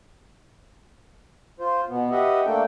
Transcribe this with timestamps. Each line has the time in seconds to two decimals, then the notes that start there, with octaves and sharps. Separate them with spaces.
1.60 F4 C5
1.89 B2 B3
2.11 G4 B4 D#5 E5 F#5
2.46 A3 A#3 D4 A4 G5